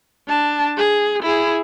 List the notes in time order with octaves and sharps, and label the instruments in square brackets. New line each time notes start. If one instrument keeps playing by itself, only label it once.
[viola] D4 A5
G#4
E4 G#4